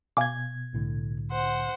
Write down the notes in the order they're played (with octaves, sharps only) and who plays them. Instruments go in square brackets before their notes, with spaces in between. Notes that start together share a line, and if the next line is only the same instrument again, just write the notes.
[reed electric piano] B2 G#6 [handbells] F5 G#5 D6
[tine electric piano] C2 A2 D3
[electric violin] C5 F#5